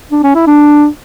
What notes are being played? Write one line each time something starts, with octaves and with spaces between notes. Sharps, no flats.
D4
C#4
E4
D4